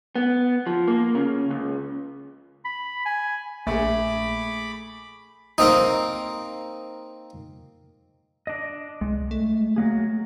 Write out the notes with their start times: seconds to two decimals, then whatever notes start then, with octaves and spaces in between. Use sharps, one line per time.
0.16 B3
0.67 F3
0.88 A#3
1.15 C#3
1.50 C#2
2.65 B5
3.05 G#5
3.67 A#1 A3 G#4 B5 D6
5.58 A#3 C4 D#4
8.47 D4 D#5
9.01 C2 G#3
9.31 A3
9.76 F#3 A#3 G#4